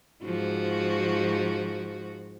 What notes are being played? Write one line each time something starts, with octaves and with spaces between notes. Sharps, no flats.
G#2 F3 F#4